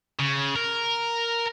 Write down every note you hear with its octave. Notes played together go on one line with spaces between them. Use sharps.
C#3
A#4